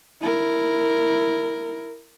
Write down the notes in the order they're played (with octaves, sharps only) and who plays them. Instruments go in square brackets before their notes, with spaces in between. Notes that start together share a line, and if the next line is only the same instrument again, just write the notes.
[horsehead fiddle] E4 A#4